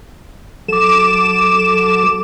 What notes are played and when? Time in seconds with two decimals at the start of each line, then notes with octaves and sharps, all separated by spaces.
0.68 F#3 A4 D6 E7